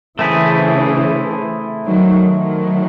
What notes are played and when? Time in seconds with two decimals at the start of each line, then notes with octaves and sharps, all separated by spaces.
0.19 C#3 E3 A3 C4 E4 G#4
1.86 D#3 F#3
2.28 D#3 F#3